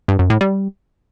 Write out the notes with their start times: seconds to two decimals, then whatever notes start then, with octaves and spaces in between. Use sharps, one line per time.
0.08 G2
0.19 F#2
0.30 A2
0.41 G3